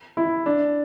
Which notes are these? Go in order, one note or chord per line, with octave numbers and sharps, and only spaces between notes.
E4
D4